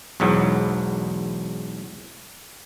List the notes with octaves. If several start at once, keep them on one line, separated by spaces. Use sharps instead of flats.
B1 E2 G#2 F#3